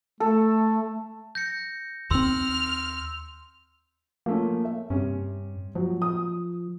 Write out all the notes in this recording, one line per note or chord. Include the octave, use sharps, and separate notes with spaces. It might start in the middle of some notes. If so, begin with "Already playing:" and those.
A3 A4
G6 A#6 C#7
D#2 C4 C6 E6 F6
F3 A3 A#3 C#4
E5
G2 C3 C#4
F3 F#3
D#6